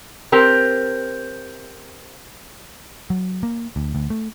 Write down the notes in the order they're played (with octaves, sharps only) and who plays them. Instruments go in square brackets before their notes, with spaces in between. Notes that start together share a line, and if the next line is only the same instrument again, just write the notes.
[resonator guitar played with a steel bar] C4 G4 A#4
[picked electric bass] F#3
A#3
D2
D2
A3